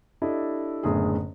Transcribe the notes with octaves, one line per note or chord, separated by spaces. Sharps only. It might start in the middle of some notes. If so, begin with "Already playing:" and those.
D4 E4 G4 A4 D#5
F#1 A2 D3 B3 G#4